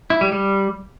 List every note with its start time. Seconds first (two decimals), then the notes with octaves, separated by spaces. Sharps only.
0.10 E4
0.21 G3
0.32 G3